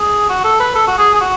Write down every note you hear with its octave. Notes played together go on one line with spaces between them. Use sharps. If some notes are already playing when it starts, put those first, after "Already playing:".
Already playing: G#4
F#4
A4
B4
A4
F#4
G#4
G#4
F#4